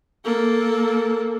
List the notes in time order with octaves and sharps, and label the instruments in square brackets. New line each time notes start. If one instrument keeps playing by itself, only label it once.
[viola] A#3 A4